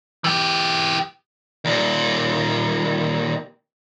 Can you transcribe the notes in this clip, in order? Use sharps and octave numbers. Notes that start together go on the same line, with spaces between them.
E3 G4
D#2 A#2